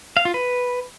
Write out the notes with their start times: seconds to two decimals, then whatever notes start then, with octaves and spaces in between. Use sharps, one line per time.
0.17 F5
0.25 F4
0.34 B4